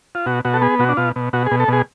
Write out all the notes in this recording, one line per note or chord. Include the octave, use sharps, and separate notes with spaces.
F4
B2 F#4
B2 F#4
A4
B3 G#4
B2 F#4
D4
B2 F4
B2
B2 F#4
G#4
B2
A4
B2 G#4